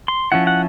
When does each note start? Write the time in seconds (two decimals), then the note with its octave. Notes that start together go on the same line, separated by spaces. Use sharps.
0.08 C6
0.32 F3 A3 C#4 E4 F#5
0.47 F#5